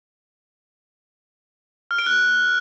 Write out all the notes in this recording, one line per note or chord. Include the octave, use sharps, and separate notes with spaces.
F6
D7
F#6